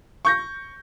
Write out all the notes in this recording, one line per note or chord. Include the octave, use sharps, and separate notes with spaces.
C#6 G6 A#6